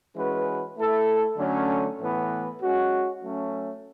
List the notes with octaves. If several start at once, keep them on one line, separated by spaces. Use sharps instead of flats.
E3 G#3 C#4 F#4 B4
A3 E4 A4
D3 F#3 A3 C#4
A2 E3 B3
G#3 C#4 F#4
F#3 A3 C#4